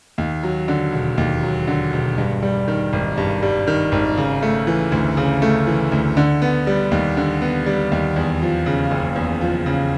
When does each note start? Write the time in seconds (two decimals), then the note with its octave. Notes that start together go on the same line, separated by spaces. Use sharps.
0.18 D#2
0.43 F#3
0.68 D3
0.93 E1
1.18 D#2
1.43 F#3
1.68 D3
1.93 E1
2.18 G2
2.43 G3
2.68 D#3
2.93 G#1
3.18 G2
3.43 G3
3.67 D#3
3.92 G#1
4.17 C#3
4.43 A3
4.67 E3
4.92 D2
5.17 C#3
5.42 A3
5.67 E3
5.92 D2
6.17 D3
6.42 B3
6.67 G3
6.91 D#2
7.17 D3
7.42 B3
7.66 G3
7.92 D#2
8.16 E2
8.42 F3
8.66 C#3
8.91 F#1
9.16 E2
9.41 F3
9.66 C#3